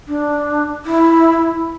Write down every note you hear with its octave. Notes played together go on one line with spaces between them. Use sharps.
D4
E4